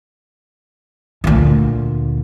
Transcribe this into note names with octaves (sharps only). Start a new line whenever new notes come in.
D2 A#2